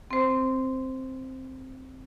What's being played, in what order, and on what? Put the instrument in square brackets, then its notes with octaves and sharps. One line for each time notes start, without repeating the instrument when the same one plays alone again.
[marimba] C4 C5